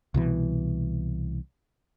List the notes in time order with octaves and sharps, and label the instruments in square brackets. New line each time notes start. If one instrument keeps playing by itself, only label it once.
[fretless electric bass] C2 B2 E3